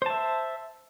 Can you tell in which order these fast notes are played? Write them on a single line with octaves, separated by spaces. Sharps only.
C5 A5 E5